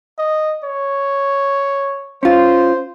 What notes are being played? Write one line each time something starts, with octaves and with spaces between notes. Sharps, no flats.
D#5
C#5
C#4 F4 C5